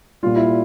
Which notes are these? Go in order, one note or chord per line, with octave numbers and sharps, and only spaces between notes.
A#2 G3 F4
E4